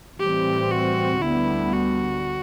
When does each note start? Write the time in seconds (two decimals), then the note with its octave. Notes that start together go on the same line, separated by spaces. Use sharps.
0.19 A2 E3 G3 C4 G4
0.71 F#4
1.22 D2 D3 G3 B3 E4
1.73 F#4